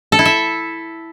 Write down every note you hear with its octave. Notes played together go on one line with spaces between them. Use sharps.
A4
E4
E5